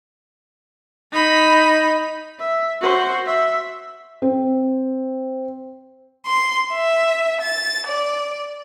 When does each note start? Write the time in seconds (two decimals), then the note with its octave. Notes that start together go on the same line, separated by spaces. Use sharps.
1.13 D#4 B5
2.39 E5
2.81 F#4 C5
3.26 E5
4.22 C4
6.25 C6
6.73 E5
7.41 A6
7.87 D5